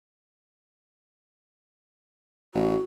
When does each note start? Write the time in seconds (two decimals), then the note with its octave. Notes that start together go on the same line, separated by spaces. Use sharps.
2.55 A1 F#4